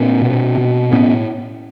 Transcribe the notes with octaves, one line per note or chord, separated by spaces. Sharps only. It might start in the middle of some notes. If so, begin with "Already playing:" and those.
Already playing: A#2 C4 D4
B2
B2
A2 B3 C#4